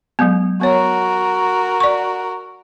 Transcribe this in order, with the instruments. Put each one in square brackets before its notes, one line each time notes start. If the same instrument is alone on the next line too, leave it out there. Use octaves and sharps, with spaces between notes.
[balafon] F#3 G#3 B3
[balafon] B3 C#5 [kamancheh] F#4 A#4
[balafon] D5 C#6